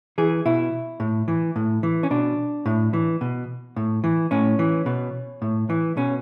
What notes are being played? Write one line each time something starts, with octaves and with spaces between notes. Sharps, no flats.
E3 G#4
B2 E4
A2
E3
A2
E3
C#4
B2 D4
A2
E3
B2
A2
E3
A2 C#4
E3
B2
A2
E3
B2 C#4